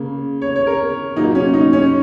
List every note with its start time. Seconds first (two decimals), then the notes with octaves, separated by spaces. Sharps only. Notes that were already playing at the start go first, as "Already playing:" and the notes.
Already playing: C#3 A#3
0.42 C#5
0.56 C#5
0.67 A#4
1.17 A#2 F#3 A#3 D#4
1.35 C#4
1.53 D#4
1.73 C#4